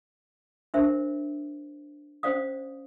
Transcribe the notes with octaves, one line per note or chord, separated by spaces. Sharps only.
D4 A#4 C5 E5
C#4 C5 D5 F5 D#6